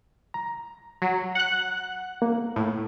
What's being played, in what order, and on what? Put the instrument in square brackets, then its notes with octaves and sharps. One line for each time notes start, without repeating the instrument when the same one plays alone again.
[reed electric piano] A#5
[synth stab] F#3
F#5 F#6
[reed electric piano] A#3
[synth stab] A2